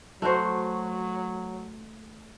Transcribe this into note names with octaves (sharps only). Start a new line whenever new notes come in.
F#3 A3 F#4 C5